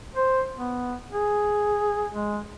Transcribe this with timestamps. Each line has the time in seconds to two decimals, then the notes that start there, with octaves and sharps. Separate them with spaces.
0.16 C5
0.56 B3
1.12 G#4
2.14 G#3